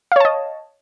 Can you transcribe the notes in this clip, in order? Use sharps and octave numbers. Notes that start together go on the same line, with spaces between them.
C#5 D#5 F5 A5